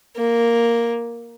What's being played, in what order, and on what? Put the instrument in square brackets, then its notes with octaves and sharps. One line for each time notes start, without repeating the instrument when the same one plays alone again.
[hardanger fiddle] A#3